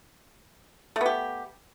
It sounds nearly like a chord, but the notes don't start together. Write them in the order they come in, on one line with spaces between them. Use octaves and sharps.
A3 B3 G4